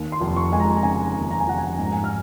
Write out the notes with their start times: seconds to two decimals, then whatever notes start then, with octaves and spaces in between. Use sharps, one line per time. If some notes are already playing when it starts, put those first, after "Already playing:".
Already playing: D#2
0.12 C6
0.21 F1
0.36 C#6
0.52 G#3 G#5
0.60 A#5
0.83 C#3 G#5
1.15 D#2
1.31 A#5
1.40 G#5
1.47 F1 F#5
1.58 G#5
1.78 G#2 G#5
1.85 A#5
1.93 G#5
2.04 F6